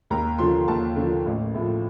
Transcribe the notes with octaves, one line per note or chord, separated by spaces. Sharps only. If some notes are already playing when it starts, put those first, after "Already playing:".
D#2 A#5
D3 F3 C6
D#2 A5
D3 F3
A1
A2 F3